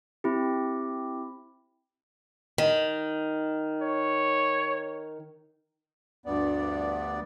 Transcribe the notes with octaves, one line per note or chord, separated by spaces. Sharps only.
C4 E4 G4
D#3
C#5
D2 G2 B3 D5